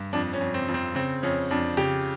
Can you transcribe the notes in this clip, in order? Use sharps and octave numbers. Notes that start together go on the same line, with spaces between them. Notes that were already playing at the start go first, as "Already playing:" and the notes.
Already playing: G2
F2 D4
C#4
F2
C4
F2
C4
C#3 C4
F2 C#4
F2 D4
C#3 G4